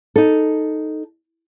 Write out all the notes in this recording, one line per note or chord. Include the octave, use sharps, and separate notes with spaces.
D#4 A4